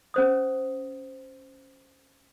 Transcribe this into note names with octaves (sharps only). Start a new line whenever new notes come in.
C#4 C5 D#6